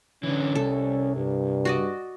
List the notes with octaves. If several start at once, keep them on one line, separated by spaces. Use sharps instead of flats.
D3 E3 C#4
C2 A4
G2
F#4 D5 D#5